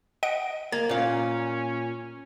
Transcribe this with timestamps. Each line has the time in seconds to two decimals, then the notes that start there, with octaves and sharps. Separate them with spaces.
0.23 D#5 F#5 D7
0.72 A#3 G#6
0.89 A#2 C#4 F5